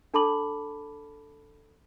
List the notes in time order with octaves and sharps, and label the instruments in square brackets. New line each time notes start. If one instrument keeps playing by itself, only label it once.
[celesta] D4 A4 A5 B5 D6 F#7